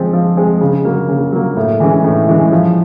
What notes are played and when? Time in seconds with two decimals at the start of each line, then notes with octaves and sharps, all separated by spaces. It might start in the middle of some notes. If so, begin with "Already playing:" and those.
Already playing: F3 G#3 C4
0.13 F3
0.37 G#3 C4
0.61 C#3
0.85 F#3 A#3
1.09 C#3
1.32 F#3 A#3
1.57 A2
1.80 E3 G#3 C#4
2.04 A2
2.28 E3 G#3 C#4
2.52 F3